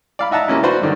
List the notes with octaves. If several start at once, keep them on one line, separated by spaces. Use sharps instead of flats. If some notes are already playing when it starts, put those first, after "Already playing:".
D5 F5 B5
D#4 E5 F#5 A5 A#5
C3 A#3 C#4 E4
D4 F#4 B4 C5 A#5 C#6
G2 D3 D#3